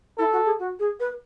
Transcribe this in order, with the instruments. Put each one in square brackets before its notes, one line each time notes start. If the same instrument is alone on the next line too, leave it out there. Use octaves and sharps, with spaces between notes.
[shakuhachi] E4 [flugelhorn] A4
[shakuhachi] F#4
G#4
F#4
G#4
B4